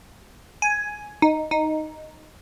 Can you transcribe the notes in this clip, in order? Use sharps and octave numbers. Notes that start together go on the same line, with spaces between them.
G#5
D#4
D#4